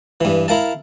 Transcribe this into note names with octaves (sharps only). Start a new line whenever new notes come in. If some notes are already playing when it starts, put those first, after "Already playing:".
G2 E3
E4 A#4 F5 A5